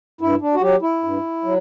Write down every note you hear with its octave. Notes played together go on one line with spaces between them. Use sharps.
G2 E4
D4
F#4
F#3 G4
E4
G2
F#3